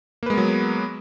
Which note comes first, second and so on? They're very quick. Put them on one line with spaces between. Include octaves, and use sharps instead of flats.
A#3 B4 G#3 B3 F#3